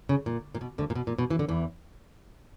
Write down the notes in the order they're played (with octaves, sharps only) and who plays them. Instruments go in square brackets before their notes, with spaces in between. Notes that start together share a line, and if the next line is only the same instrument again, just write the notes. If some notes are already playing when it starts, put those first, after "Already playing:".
[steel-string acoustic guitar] C#3
A#2
A#2
B2
D2 D3
A#2
B2
A#2
B2
E3
D3
E2 E3